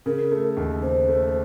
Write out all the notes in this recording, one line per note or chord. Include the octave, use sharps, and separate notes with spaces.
C#3 A#4
A3
D#2
C#3 C5
A3